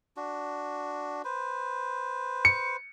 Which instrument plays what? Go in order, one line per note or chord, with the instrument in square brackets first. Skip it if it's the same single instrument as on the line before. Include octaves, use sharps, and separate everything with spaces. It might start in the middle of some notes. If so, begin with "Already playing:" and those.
[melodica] D4 F#4
B4 C5
[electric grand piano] C#7